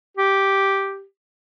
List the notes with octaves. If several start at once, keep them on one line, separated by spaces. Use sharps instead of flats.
G4